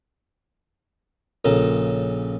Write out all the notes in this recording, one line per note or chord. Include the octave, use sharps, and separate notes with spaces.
A#1 C#3 A4 A#5